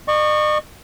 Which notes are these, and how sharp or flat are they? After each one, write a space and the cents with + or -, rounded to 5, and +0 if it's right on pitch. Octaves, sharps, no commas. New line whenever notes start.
D#5 -45 C#6 +0